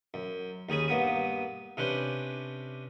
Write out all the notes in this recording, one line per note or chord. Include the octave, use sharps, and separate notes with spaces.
F#2
D#2 C#4 G#4 B5 D#6
G2 A#3 B3 D#6
C3 C#4 D4 B4 C5